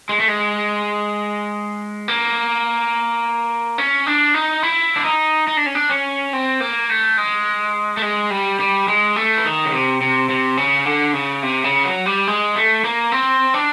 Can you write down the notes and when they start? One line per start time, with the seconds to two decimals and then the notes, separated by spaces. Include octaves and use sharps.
0.09 G#3
0.20 A3
0.28 G#3
2.08 A#3
3.78 C#4
4.07 D4
4.34 D#4
4.63 E4
4.96 D4
5.05 D#4
5.47 D#4
5.57 D4
5.66 C#4
5.75 D4
5.90 C#4
6.33 C4
6.60 A#3
6.90 A3
7.17 G#3
7.97 A3
8.02 G#3
8.30 G3
8.60 G3
8.88 G#3
9.16 A3
9.36 E3
9.45 D#3
9.65 C#3
9.72 C3
10.01 C3
10.29 C3
10.57 C#3
10.86 D3
11.13 C#3
11.43 C3
11.64 C#3
11.84 F#3
12.06 G3
12.27 G#3
12.56 A3
12.84 A#3
13.12 C4
13.54 D4